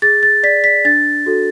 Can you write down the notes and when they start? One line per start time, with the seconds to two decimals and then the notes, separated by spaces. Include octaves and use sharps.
0.02 G#4 A6
0.23 A6
0.43 D5 B6
0.64 B6
0.85 D4 A6
1.26 F#4 A4